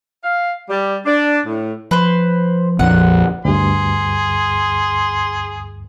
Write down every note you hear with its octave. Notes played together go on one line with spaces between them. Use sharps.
F5
G3
D4
A2
F3 B4 C5
A#1 F2 F#5
D2 G2 G#4 C6